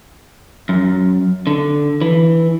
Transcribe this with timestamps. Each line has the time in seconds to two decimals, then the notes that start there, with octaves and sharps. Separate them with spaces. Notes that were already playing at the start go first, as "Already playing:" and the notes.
0.69 F#2
1.47 D3
2.01 E3